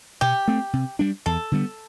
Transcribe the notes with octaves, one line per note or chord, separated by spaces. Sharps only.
B2 G4
A3 C4
C3
G3 D4
E2 A4
D3 G3 B3